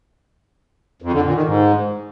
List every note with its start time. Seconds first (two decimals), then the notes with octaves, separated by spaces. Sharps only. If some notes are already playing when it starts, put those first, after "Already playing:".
1.02 F2
1.13 D3
1.24 A#2
1.34 D#3
1.45 G#2